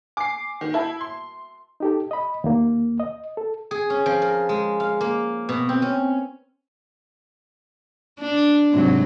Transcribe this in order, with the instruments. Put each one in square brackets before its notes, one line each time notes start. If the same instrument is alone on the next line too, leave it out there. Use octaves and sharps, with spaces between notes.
[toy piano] G#5 [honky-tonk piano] D6 C7
[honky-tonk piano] D#3 [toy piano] F#4 G5
[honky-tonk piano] E4 [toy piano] A#4 E5 A5
[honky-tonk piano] C6
[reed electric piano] D#4 G4 A4
D#5 B5
D#2 A#3
D#5
A4
[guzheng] G#4
C#4
F3
A#4
G#3
F5
A#3
B2
C4
C#4
[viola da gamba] D4
G#2 C3 F#3